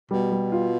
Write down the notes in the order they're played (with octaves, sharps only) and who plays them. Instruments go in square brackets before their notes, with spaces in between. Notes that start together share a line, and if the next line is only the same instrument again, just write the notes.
[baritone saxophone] B2 [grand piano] G3
[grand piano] G3
F4